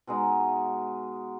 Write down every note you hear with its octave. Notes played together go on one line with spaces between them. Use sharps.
B2 G#3 D#4